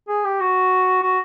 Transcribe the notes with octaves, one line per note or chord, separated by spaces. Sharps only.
G#4
G4
F#4
F#4